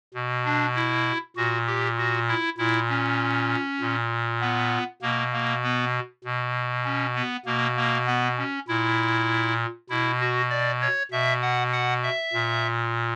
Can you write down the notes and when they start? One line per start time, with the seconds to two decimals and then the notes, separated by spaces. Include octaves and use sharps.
0.14 B2
0.45 D4
0.75 E4
1.37 A#2 F#4
1.67 G4
1.98 F#4
2.28 E4
2.58 A#2 E4
2.89 C#4
3.81 A#2
4.41 B3
5.02 B2 A#3
5.33 A#3
5.64 B3
6.24 B2
6.85 C#4
7.15 B3
7.46 B2 A#3
7.77 A#3
8.07 B3
8.38 C#4
8.68 A#2 E4
9.90 B2 E4
10.20 F#4
10.50 D5
10.81 C#5
11.11 B2 E5
11.42 F#5
11.73 F#5
12.03 E5
12.33 A#2